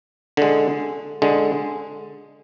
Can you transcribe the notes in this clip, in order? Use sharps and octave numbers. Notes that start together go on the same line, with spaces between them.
D3 G#3
D3 G#3